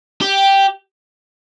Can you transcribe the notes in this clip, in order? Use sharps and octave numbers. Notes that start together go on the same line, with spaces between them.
G4